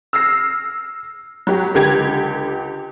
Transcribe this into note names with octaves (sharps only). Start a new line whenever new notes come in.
E6 F6 A#6 C7
F#3 G4
C#2 D3 G4 G#6